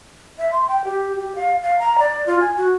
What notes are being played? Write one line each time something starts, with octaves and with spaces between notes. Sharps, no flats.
E5
C6
G5
G4
G4
F5
F5
A#5
D5
F4
G#5
F#4